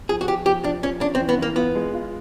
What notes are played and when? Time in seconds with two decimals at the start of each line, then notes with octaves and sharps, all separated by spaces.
0.09 F3 G#4
0.21 F#4
0.28 F3 G4
0.46 F3 G4
0.64 F3 D4
0.83 F3 C#4
1.01 C#4 D4
1.15 C4
1.20 E3
1.29 B3
1.38 E3 A#3
1.56 B3 F4
1.75 G#3
1.93 F4